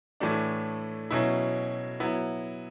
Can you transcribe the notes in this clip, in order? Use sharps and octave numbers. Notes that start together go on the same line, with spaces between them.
A2 E3 A3 D4
B2 F#3 C#4 E4
F#3 B3 E4